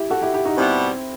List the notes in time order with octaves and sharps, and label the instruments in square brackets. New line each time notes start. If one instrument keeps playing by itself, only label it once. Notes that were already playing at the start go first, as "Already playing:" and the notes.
Already playing: [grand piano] E4 G4
F#4 A4
E4 G4
E4 G4
D#4 F#4
[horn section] B2 G3 B3 [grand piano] C4 E4